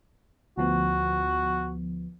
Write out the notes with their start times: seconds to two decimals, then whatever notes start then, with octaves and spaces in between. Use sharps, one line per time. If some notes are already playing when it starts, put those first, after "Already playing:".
0.58 D2 F3 B3 F#4